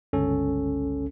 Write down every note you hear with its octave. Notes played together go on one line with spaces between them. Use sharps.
G1 C#2 C#4 A4